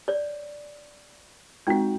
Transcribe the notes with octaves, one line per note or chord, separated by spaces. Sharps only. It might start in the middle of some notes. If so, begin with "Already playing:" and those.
C#5 D5
G#3 C4 D#4 F#4 G5